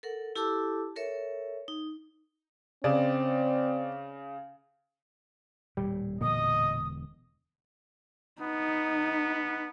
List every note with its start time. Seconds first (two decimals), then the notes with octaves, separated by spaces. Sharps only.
0.03 A4 A#4 F#5
0.36 E4 G4 A4 A5 D6 E6
0.96 A4 A#4 C#5 E5
1.68 D#4
2.84 C#3 C4 D5
5.77 D#1 A2 G3
6.21 E1 A#2 D3 D#5 D#6
8.42 B3 D#4